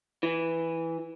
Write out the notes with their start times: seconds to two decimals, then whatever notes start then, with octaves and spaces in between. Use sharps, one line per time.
0.23 E3